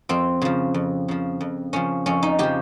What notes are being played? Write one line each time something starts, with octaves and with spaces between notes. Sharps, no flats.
F2 C4
C#3 F3
F2
C#3 F3
F2
C#3 F3 C#4
F2 C#4
D#4
C#3 F3 G4